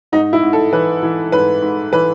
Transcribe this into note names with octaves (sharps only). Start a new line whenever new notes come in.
G#2 D#4
E4
G#2
A4
E3 B4
E3
G#2 B4
G#2
E3 B4